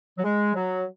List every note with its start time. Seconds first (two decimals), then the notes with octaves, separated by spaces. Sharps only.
0.18 F#3
0.23 G#3
0.55 F#3